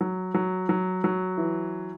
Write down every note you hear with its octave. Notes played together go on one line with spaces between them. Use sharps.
F#3
F#3
F#3
F#3
E3